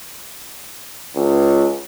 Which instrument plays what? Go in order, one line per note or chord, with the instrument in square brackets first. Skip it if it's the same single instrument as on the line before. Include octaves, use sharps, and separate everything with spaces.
[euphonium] C#2